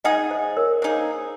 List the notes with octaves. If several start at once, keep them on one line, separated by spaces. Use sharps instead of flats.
G#3 D#4 G#4 D#5 F#5
C5 D#5
A#4 C#5
A#3 D#4 G#4 C5